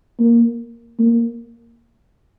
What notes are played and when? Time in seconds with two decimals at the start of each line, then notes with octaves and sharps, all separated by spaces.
0.19 A#3
0.99 A#3